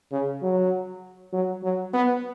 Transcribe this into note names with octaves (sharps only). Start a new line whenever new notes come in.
C#3
F#3
F#3
F#3
B3